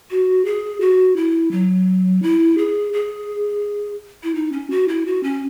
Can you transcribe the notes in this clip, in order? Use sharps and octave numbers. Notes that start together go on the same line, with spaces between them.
F#4
G#4
F#4
E4
F#3
E4
G#4
G#4
E4
D#4
C#4
F#4
E4
F#4
C#4